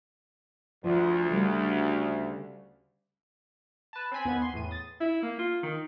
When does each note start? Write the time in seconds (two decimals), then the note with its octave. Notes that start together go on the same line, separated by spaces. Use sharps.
0.84 D2 F3
1.30 C#3 G3 A3
3.93 B4 A5
4.12 C4 C5 G#5 B5
4.25 D#2 B3 G#5 B5 G#6
4.42 C6
4.53 E2 A2 D#7
4.71 D#6 A6
5.01 E4
5.22 A#3
5.39 F4
5.63 D#3